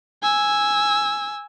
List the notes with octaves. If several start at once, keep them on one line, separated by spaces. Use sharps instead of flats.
G#5 E6